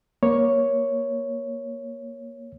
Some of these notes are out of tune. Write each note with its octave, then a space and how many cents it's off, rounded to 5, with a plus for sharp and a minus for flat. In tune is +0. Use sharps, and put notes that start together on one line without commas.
A#3 +20 C#5 +0